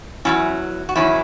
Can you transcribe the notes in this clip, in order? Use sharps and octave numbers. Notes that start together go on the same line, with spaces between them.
E2 D#3 F#3 C#4 E4
F#4
E2 D#3 F#3 C#4 E4